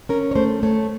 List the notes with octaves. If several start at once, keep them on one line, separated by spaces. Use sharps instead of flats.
C#4 A#4
C#5
A3 C5
A3 C#5